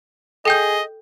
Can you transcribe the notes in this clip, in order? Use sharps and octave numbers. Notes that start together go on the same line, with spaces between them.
G#4 A4 D#5 G5 G6